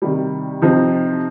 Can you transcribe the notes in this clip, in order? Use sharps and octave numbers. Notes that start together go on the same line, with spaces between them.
C3 D#3 G3
C3 F3 C4 D#4